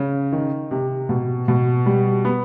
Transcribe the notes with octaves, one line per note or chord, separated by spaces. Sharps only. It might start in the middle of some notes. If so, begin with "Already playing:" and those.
Already playing: C#3
D#3
C3
B2
B2
G3
B3